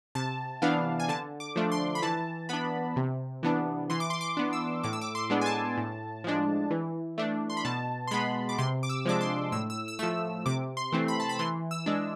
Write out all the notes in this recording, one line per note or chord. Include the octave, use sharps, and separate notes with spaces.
C3 A5
E3 B3 D4 F5
G#5
D3 A5
D6
F3 A3 D4
C6
B5
E3 A5
B3 D4 B5
C3
E3 B3 D4
E3 C6
D6
C6
D6
B3 D4
E6
A2 D6
E6
D6
C6
G#3 B3 D4
G#5
A5
A2
F3 G#3 D4
E3
A3 D4
C6
B5
B2 A5
C6
G#3 B3 B5
D6
C3 C6
D6
E6
F3 G#3 D4 D6
C6
A2 E6
E6
E6
F3 A3 E6
C3 D6
C6
E3 A3 C4
B5
A5
B5
E3 C6
E6
G#3 D4